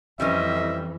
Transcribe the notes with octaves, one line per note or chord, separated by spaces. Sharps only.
F2 E3 G3 C4 C#4 D#5 E5